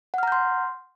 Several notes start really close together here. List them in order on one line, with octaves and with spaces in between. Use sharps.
F#5 F6 A#5 G6 C6